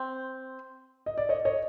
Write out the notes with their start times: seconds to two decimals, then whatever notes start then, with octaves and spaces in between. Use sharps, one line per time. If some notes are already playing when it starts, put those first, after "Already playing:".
Already playing: C4
1.06 D#5
1.18 D5
1.29 C#5 D#5
1.45 C#5 D#5